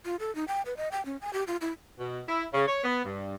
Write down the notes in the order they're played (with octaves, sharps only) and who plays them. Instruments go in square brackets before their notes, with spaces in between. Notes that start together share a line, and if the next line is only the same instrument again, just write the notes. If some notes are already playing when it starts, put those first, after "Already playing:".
[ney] F4
A4
D#4
G5
B4
D#5
G5
C#4
G#5
G4
F4
E4
[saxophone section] B2
E4
C#3
C#5
B3
G2